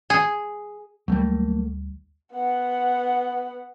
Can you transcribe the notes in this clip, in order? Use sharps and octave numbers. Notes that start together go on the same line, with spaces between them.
G#4
D2 F#3 G3 A3 A#3
B3 F#5